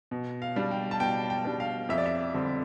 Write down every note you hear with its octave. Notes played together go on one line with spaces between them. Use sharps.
B2
F5
G3 D4
G5
A5
B2 G5
G5
G3 D4
F5
F2 E5
D5
E5
D3 G3 C4